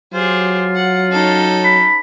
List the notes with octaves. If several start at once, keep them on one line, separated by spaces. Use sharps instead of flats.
F#3 F4 G4 G#4 C5
F#5
C#4 D#4 A4
B5